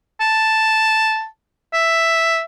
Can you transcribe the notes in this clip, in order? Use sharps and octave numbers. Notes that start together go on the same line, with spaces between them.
A5
E5